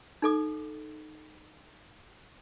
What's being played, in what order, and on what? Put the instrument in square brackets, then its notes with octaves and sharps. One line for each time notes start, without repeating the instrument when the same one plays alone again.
[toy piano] D#4 A4 D6